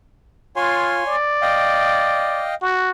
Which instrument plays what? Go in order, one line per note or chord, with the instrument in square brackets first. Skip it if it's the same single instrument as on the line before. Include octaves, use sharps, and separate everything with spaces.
[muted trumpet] F4 [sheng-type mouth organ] C#5 G#5 C6
[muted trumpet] D5
[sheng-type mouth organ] D#5 F5 G5
[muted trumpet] F#4